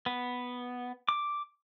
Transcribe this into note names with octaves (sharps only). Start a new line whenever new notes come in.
B3
D6